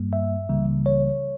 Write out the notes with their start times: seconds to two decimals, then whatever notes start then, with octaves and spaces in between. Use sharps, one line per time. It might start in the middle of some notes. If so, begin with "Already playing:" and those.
Already playing: G2 G3 A#3
0.13 E5
0.49 C#2 C#3 E3 G3 A#3
0.86 C#5